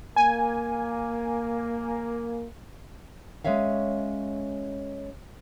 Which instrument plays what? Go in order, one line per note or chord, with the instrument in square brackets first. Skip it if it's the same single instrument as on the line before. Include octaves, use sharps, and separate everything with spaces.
[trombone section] A#3 [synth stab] G#5
[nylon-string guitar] G#3 C#4 C#5 E5 F5